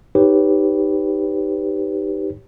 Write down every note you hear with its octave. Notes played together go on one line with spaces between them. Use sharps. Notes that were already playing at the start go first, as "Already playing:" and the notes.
D#4 G4 B4 C#5